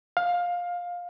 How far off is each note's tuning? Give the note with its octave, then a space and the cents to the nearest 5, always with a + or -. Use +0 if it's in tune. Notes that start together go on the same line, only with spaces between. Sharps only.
F5 +15